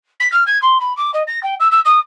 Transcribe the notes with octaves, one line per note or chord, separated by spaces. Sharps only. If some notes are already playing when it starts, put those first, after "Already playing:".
B6
F6
G#6
C6
B5
D6
D#5
A#6
G5
E6
E6
D#6